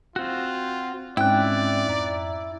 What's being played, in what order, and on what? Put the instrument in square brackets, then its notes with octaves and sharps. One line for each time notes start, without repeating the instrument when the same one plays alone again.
[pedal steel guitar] C4 F#4 [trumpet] F4
[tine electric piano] G#2 C4 C#4 [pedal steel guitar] E4 F#6 [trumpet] D5 [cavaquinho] G5
[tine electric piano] F2 E5 A#5